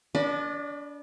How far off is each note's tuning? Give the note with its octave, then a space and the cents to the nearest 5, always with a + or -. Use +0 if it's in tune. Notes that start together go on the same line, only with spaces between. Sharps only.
D4 -30 B4 -30 D5 +35